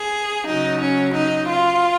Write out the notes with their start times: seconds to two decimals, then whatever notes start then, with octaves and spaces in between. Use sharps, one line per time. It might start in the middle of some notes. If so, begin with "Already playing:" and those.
Already playing: G#4
0.47 C#3 F#3 D#4
0.81 C#4
1.15 D#4
1.49 F4